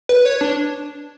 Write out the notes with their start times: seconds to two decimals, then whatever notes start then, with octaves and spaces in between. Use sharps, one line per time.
0.09 B4
0.25 C#5
0.41 D4